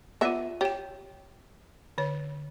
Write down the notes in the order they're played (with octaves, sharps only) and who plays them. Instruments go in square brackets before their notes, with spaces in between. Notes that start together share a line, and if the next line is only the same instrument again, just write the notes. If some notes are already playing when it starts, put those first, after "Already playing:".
[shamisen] B3 E5 [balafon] F4 D5
[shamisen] G4 [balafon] C#5 G5
[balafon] D3 C#5